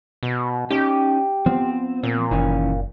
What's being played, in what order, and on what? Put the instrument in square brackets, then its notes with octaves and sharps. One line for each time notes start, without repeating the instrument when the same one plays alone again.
[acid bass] B2
[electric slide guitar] C#4 D#4 [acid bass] G4
[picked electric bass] F3 B3 [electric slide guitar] C4
[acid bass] A#2 [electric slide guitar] C4
[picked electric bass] F#1 [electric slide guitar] D#3 E3 C#4